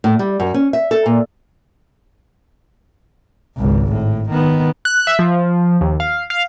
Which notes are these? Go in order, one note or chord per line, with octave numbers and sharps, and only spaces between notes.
A2
G3
F#2
C#4
E5
A4
A#2
G#1 C#2
A2
D#3 B3
F#6
E5
F3
D#2
F5
F5